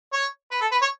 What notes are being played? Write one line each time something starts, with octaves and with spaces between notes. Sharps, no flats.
C#5
B4
A4
B4
C#5